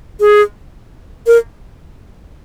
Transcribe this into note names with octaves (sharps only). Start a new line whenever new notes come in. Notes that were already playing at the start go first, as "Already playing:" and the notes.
G#4
A#4